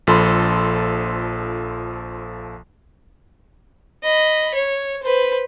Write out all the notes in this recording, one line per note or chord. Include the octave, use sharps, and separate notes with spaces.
A#1 F3 A4 B5 C6
D#5 B5
C#5
B4 C5